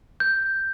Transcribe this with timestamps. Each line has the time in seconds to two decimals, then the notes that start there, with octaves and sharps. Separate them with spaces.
0.20 G6